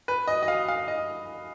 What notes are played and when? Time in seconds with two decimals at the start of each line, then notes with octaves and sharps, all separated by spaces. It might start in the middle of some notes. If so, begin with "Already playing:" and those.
0.08 B4
0.27 D#5
0.43 D#5
0.48 F5
0.68 F5
0.88 D#5